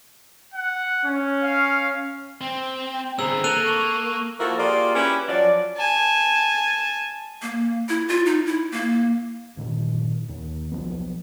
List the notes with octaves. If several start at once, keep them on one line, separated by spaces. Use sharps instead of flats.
F#5
C#4
F5
C4 G5
D3 B3 C4 G#4 A#5 E6
A#3 A4 F#6 D#7 F7
C#6
F3 A#3 E4 F#4 A4 A#4
A#3 F4 G4 G#4 D5
C#4 E4 G4 B4
F3 F#3 D5
G#5 A5
A#3
E4
F4
D#4
E4
A#3
G1 A#2 D#3
D#2
B1 F3 B3